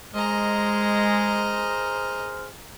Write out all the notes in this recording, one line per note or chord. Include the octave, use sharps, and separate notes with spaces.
G#3 G#4 A#4 C5 D#5 A#5